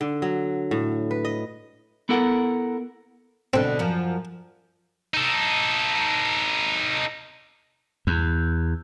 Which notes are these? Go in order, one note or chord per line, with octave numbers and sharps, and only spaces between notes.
D3
F#3
A2
B4
D#5
B3 E4 A4 A#4 F#5
B2 D3 C4
F#2 F3
D#4 A4
E2